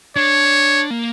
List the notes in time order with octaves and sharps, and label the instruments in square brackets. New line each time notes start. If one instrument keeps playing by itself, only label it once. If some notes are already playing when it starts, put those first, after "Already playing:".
[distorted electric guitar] D4 [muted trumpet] C#5
[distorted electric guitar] A#3